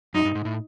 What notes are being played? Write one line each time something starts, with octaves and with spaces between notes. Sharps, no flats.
F#2 D#4
G2
G#2
A2